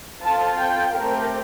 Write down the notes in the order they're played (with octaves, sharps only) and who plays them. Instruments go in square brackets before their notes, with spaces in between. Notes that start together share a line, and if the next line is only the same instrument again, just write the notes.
[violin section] C4 F4 A4 A5
G5
A3 C4 G4 A#4